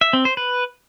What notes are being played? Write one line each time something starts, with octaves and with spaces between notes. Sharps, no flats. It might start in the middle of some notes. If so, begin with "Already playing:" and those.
E5
C4
C5
B4